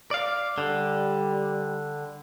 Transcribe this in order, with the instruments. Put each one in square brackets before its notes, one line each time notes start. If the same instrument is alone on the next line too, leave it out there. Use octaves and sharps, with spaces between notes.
[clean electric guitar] D5 F5
[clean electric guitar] D3 [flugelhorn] G3